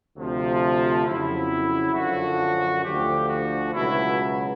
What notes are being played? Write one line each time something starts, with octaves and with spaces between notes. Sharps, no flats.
D2 C3 F3
F2 C#3 F#3 E4
F#2 D3 F3 F#4
D2 D3 F3 G4
F#4
C#2 B2 F#3 E4